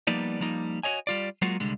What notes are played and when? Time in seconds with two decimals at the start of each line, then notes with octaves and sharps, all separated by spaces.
0.07 F3 G3 A#3 B3 D#4 D5
0.40 F3 G3 A#3 D#4
0.83 F#4 A4 C#5 D#5 G#5
1.07 G3 F4 D5
1.42 F#3 G#3 A#3 F4 F#4
1.60 C2 D3 G3 G#3